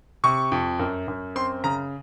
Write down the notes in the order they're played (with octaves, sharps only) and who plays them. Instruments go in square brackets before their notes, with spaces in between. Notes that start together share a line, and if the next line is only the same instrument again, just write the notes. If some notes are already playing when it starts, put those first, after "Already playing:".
[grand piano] C3 C#6
F2
F#2
F#2
C4 C6
C#3 A#5